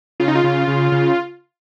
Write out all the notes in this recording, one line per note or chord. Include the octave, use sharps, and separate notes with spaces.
C#3 F4
D#4
F4
C#3
C#3
C#3